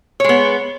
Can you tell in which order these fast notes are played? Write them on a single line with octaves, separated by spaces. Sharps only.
C#5 G#3 B3